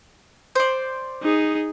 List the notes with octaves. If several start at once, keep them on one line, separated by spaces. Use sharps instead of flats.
C5 D5
D#4 G#4